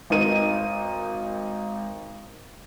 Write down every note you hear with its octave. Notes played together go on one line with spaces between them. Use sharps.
G#1 D#4 A#4 D#7